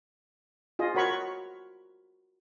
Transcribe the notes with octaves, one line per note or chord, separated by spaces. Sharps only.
F4 G#4 D#5
F#4 A#4 C#5 B5 C#6